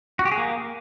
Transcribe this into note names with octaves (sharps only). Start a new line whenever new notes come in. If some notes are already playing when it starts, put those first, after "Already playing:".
F#4
G4
G#4
A#3